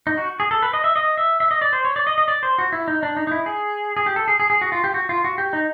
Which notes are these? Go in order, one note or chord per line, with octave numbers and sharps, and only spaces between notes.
D#4
F#4
G#4
A4
B4
D#5
E5
D#5
E5
E5
D#5
D5
C5
C#5
D5
D#5
D#5
D5
C5
F#4
E4
D#4
D4
D#4
D#4
E4
G#4
G#4
G4
A4
G#4
G#4
G#4
F#4
F4
G4
F#4
F4
F#4
G4
D#4